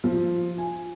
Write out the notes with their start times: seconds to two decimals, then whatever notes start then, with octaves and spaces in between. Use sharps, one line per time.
0.04 F3
0.58 G#5